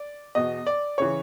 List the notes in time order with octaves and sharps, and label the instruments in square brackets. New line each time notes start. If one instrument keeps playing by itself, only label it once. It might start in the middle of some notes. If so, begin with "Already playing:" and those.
Already playing: [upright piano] D5
E2 B2 D#5
D5
C#3 E3 C#5